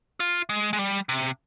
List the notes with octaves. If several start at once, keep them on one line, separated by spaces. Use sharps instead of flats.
F4
G#3
G#3
G3
C3